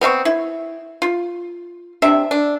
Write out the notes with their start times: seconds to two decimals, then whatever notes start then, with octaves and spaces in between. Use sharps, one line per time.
0.01 B3 C4 E5 C#6
0.25 E4
1.02 F4
2.02 C3 D4 E5
2.31 D4